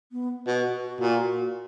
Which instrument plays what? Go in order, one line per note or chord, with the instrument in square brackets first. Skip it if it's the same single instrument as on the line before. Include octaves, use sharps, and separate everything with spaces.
[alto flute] B3
[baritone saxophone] B2 [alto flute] F#4
[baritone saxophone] A#2